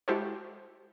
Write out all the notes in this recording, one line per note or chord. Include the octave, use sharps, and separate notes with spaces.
G#3 E4 F#4 G4 A4 C5